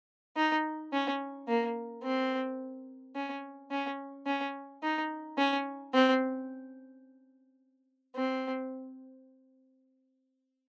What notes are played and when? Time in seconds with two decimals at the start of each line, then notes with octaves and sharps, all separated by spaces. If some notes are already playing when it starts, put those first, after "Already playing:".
0.37 D#4
0.93 C#4
1.48 A#3
2.04 C4
3.16 C#4
3.71 C#4
4.26 C#4
4.83 D#4
5.38 C#4
5.94 C4
8.16 C4